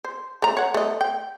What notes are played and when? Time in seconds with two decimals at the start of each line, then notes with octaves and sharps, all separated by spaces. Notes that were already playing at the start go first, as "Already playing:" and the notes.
0.04 C5
0.42 A3 A#5
0.57 C#5 F#5
0.74 A3 D#5
1.01 G5